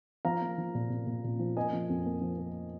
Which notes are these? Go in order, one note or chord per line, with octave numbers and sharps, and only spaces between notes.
F3 F5 A#5
A#3
F3
A#2
A#2
A#2
A#2
F3
A#3 D#5 G#5
F3
F2
A#3
F3
A#3